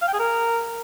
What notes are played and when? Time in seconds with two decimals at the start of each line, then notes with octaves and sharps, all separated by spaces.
0.02 F5
0.08 G5
0.14 G#4
0.19 A#4